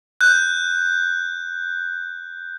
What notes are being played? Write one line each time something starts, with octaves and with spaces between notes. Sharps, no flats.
F#6 G6